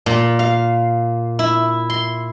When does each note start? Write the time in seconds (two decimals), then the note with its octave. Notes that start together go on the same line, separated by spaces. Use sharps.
0.06 A#2
0.39 F5
1.39 E4
1.90 C6